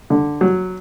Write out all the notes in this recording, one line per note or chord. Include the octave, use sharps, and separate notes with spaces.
D3
F#3